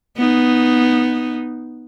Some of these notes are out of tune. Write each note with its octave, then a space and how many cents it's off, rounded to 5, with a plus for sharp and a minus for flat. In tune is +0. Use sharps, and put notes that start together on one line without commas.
B3 +0 D#4 +0